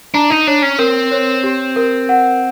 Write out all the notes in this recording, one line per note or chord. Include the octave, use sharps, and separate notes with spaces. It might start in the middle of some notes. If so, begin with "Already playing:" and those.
D4 A#5
D#4
D4 C#5
C#4
C4 A#4
C#5
G4
A#4
F#5